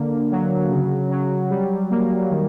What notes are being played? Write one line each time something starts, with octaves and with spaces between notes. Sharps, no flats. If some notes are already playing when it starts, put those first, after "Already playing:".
Already playing: D3 A#3
F#3
C#3
F#3
G3
A#3
D#3